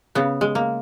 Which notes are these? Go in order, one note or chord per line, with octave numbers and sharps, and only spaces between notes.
C#3 B3
G#3
A#3